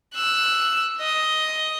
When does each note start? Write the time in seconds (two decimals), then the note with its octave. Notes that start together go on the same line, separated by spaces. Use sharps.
0.14 E6 F#6
1.01 D#5